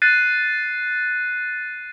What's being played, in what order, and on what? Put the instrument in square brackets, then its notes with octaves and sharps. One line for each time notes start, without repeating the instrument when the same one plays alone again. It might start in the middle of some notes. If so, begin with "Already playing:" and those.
[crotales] F#6 A6 C7 D#7